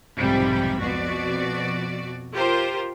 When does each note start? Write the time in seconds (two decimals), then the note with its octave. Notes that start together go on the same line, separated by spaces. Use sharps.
0.17 B1 F2 G#2 C3 G3 B5
0.79 F2 B2 F#4 D5
2.35 F4 G4 A#4 C5